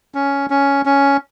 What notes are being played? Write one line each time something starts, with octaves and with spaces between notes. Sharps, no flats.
C#4
C#4
C#4